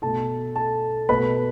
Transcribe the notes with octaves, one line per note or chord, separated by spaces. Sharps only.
B2 A3 A4 A5
A4 A5
B2 A3 B4 B5